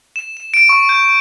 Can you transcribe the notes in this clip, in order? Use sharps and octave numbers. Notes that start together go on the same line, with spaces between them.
E7
E7
D7
C#6
G6